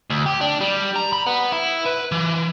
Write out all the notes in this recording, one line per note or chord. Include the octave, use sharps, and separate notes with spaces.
D2
G4
D4
G3
A#5
B5
B3
E4
B4
E3